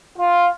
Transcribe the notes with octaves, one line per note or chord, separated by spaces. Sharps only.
F4